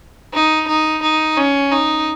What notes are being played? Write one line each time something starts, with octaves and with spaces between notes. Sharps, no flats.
D#4
D#4
D#4
C#4
D#4